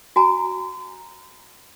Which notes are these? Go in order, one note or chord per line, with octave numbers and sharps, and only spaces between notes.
F#4 G#5 A#5